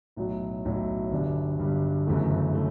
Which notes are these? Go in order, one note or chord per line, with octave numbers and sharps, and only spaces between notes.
B1 A2 F#3
B1 A2 F#3
G1 G2 D3 G3 D4
G1 G2 D3 G3 D4
G1 F#2 C#3 E3 A3
C#3 E3 A3